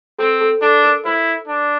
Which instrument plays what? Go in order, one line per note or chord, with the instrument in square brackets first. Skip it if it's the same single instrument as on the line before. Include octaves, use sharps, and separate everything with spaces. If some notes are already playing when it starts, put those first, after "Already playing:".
[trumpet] C4 [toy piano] A4
[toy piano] A4
[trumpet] D4 [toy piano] A4
[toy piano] A#4
[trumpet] E4 [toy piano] C5
[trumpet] D4